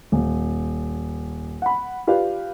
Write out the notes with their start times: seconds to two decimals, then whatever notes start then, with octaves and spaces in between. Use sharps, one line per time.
0.12 D#1
1.62 F#5 B5
2.07 F4 G4 B4 D5 F5